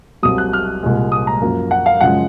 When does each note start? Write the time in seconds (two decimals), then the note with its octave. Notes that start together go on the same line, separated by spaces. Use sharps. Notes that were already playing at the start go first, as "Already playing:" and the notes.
0.23 C2 C3 F#3 D#6
0.38 F#6
0.53 F6
0.83 C2 A#2 G#3
1.12 D#6
1.27 A#5
1.41 F#2 F3 A#3
1.71 F#5
1.86 F5
2.01 F#2 C#3 F3 G#3 F#5